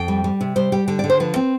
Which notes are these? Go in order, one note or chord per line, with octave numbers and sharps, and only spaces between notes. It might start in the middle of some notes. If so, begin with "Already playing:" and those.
Already playing: F2 G5
G3
G3
C3
G3 C5
G3 G4
D3 G4
D3 D5
C5
F3 B4
C4